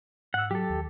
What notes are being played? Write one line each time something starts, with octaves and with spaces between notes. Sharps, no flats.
G#2 F#5 E6
F#3 G4 A4
D#2